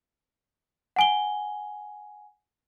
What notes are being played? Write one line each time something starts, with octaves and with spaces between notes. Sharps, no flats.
F#5 G#5 G7